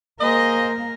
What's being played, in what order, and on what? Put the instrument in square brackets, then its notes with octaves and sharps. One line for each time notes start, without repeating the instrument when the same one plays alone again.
[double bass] A#3 [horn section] G#4 C5 D#5 [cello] A#4